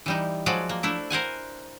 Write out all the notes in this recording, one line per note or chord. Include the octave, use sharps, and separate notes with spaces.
E3 G3 D#4
F3 F#3 G#3 F#4 D5
A#3
A3 D4 E4
A#4 C5 F#5 G#5